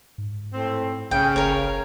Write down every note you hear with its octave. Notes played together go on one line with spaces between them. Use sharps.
G#2
A2 C4
B1 C#3 G5
F#1 A#4 C#5